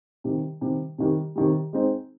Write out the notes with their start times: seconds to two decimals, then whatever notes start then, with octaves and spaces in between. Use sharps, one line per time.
0.24 C3 D#3 G3
0.61 C3 D#3 G3
0.98 C3 D#3 G3
1.35 C3 D#3 G3
1.73 G#3 C4 D#4